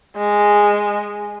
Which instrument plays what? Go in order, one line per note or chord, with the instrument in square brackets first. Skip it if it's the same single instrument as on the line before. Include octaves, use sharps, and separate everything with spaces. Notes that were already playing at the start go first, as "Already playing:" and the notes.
[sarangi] G#3